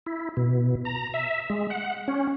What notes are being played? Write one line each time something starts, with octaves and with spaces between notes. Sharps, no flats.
E4
B2
A#5
E5
G#3
F#5
C#4